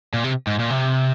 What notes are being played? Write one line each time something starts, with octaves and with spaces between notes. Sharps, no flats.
A#2
C3
G#2
A#2
C3